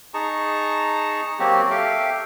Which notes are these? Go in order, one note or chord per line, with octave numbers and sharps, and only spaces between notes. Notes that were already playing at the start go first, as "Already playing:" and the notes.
D#4 G#4 A5 A#5 C#6
F#3 A#3 C4 F#4 G4
G4 A4 E5 F5 G5